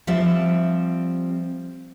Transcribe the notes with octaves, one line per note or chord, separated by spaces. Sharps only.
F3 G3 C4 E5